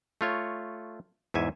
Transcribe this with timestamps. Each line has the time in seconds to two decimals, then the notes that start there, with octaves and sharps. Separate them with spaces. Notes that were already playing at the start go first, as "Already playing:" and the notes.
0.21 A3 F4 C#5
1.34 E2 G#2 E5 G#5